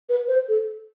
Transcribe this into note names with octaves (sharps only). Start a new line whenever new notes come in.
B4
C5
A4